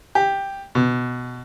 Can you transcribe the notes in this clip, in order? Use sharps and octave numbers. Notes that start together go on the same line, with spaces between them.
G4
B2